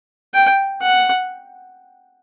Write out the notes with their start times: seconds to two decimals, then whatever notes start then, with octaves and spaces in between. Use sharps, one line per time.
0.34 G5
0.82 F#5